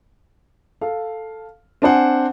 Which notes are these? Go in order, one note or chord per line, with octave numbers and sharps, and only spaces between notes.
A4 F5
C4 D4 C5 F#5 G#5